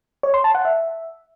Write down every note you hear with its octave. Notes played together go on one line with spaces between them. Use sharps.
C#5
C6
A5
F#5
E5